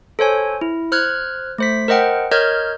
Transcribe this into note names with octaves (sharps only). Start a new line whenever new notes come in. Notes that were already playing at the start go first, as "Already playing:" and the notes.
A4 C5 C#5 G#5
E4
C5 F6 F#6 G#6
A3 C5 B6
A#4 C5 D#5 F#5 G5
A#4 C#5 D#5 F6 G6 G#6